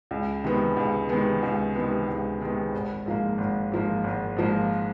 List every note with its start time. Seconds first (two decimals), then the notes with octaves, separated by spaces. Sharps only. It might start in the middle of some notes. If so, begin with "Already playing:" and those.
0.11 C#2
0.44 C3 D#3 G#3 B3
0.77 C#2
1.09 C3 D#3 G#3 B3
1.42 C#2
1.74 C3 D#3 G#3 B3
2.08 C#2
2.40 C3 D#3 G#3 B3
2.73 G#1
3.06 G#2 F3 A#3
3.38 G#1
3.72 G#2 F3 A#3
4.04 G#1
4.37 G#2 F3 A#3